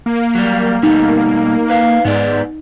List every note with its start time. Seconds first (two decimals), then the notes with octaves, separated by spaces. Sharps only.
0.06 A#3
0.35 F#3 G3
0.83 B2 G3 A3 D#4
1.70 B4 F5
2.05 G#2 B3 D5